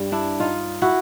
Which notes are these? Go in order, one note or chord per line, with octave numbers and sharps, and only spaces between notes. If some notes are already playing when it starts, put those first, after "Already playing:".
Already playing: G2 G3
D4 E4
D#4 F4
E4 F#4